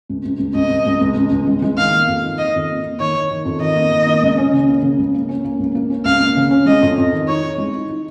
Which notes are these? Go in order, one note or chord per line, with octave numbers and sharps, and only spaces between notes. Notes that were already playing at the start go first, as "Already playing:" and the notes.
C#2
C#2
C#2
C#2 D#5
C#2
C#2
C#2
C#2
C#2
G#3
G#3
D#3 F5
A#3
F2
D#3
D#3 D#5
F2
A#3
A#3
D#3 C#5
D#3
D#3
F2
D#3 D#5
A#3
D#3
A#3
C#2
C#4
C#3
A#3
C#3
C#2
A#3
C#4
A#3
C#2
A#3
C#4
C#2 F5
A#3
C#3
C#4
G#3 D#5
F2
F2
D#3
D#4 C#5
D#4
G#3
D#4
D#4